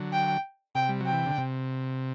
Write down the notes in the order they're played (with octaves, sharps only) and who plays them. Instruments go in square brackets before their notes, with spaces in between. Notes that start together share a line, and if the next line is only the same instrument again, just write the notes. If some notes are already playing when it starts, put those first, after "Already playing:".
Already playing: [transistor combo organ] D3 F#3
[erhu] G5
[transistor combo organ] C3 [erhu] G5
[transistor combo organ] G3
F#3
[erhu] G5
[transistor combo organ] E3
D3
C3